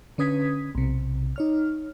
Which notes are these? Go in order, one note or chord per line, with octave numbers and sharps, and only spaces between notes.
D3 C#4 B4 D#6 G#6 B6
B1 C3
D#4 C#5 F6